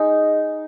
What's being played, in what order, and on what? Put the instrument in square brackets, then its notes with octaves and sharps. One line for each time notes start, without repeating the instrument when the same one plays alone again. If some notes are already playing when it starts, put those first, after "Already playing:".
Already playing: [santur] G#3 D#4